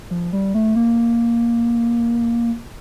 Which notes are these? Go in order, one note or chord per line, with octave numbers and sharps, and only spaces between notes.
F3
G3
A3
A#3